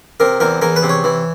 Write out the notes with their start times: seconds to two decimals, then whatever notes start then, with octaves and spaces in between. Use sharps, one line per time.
0.20 C3 A#4
0.40 E2 A#4
0.62 E2 A#4
0.76 B4
0.83 C3
0.89 C#5
1.04 E3